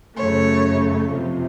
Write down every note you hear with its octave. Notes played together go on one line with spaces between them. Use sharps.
F#2 C#3 A3 C#5
F2 C3 F3